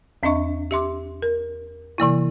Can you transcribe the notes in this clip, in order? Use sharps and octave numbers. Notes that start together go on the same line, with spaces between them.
E2 C4 D4 D#5 E5 C#6
G4 E5 C6 D6
A#4
C3 E3 A#3 E4